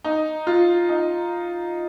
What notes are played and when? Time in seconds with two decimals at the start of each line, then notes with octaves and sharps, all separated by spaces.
0.04 D#4
0.47 F4
0.89 D#4